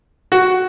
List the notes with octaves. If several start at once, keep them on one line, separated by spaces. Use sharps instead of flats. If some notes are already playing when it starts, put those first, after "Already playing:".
F#4